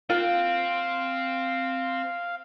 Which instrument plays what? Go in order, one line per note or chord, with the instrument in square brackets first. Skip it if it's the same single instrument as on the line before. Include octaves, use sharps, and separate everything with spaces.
[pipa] A#3 F4 F#5 [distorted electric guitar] C4 [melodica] F5